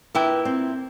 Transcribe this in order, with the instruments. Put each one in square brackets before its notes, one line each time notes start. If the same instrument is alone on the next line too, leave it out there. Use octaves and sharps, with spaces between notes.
[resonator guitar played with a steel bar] A#2 E4 G5 [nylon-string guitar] B4
[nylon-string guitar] C4